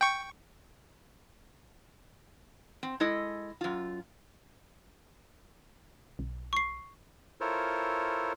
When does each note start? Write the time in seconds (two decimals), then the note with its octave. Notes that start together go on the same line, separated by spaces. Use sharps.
0.01 G5 C#6
2.83 C4
3.00 G#3 E4 A4 D#5
3.61 F#2 F4
6.19 B1
6.53 C#6 C7
7.41 E4 F4 A4 A#4 C5 C#5